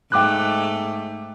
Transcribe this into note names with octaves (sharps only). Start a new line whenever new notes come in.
G#2 A3 G5 D6 F#6